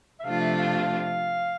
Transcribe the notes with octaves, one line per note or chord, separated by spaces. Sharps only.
E5
C3 F3 A3 D4 F4 F5
E5
F5
F5